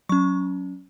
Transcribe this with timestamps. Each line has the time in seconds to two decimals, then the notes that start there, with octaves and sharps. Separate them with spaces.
0.09 F#3 C#4 C#6